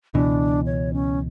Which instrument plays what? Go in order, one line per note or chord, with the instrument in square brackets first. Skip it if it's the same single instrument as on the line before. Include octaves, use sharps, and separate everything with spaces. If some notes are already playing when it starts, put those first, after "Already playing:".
[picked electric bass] C#2 B2 E3 [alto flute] D4
[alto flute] C#5
C#4